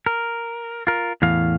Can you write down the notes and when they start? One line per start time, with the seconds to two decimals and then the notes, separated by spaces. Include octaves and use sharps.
0.06 A#4
0.87 F4 A#4
1.22 E2 A2 E3 F5